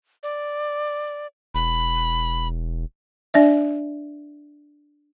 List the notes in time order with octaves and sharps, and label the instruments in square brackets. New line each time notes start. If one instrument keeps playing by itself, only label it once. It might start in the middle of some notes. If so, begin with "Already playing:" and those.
[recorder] D5
[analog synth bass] E1 [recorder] B5
[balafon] D4 D5 E5